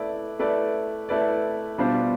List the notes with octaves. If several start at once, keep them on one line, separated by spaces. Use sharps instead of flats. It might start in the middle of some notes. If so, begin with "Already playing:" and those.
Already playing: A3 E4 B4 D5
A3 E4 B4 D5
A3 E4 B4 D5
B2 G3 D4 F4 C5